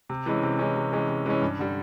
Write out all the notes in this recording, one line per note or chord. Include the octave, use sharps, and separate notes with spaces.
C3
E3 G#3 C#4
C3
E3 G#3 C#4
C3
E3 G#3 C#4
C3
E3 G#3 C#4
G2
D3 G3